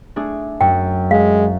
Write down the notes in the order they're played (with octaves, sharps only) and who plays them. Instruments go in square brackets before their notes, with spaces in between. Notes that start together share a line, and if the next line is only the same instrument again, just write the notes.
[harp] A3 D4 G#4
[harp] F#2 [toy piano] G5
[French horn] G#3 [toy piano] F5